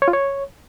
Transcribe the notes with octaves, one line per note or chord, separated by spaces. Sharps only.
C#5
F4
C#5